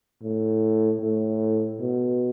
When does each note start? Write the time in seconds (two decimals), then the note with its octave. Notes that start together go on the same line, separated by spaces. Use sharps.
0.23 A2
1.01 A2
1.80 B2